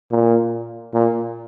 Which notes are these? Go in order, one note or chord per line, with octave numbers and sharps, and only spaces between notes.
A#2
A#2